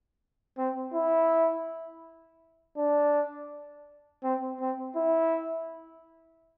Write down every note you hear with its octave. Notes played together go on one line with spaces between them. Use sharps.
C4
E4
D4
C4
C4
E4